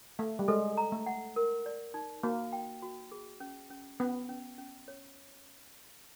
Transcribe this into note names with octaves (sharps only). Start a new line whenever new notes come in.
A3 F5
G3
G#3 A4
A#5
A3
F#5
A#4
D5
D#4
A#3 F#4
G5
F#4
G#4
C#4
C#4
B3 C#4
C#4
C#4
C#5